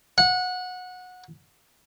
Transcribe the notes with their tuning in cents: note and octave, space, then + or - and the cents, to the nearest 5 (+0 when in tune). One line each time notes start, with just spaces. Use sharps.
F#5 -20